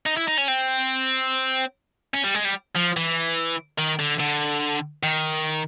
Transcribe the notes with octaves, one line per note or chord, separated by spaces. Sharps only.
D#4
E4
D#4
C#4
C4
C#4
G3
G#3
G3
F3
E3
D#3
D3
D3
D#3